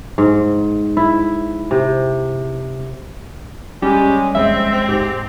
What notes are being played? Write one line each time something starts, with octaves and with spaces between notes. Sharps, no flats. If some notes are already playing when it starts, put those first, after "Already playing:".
G#2
E4
C3
G3 G#3 C#4 G4
A#1 D#2 G#3 C4 E5
G#2 G4